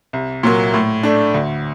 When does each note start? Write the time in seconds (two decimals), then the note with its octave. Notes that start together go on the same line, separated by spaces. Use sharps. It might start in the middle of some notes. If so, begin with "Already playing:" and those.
0.13 C2
0.43 A#2 F#3 A#3
0.74 A2
1.03 A3 D4
1.34 D2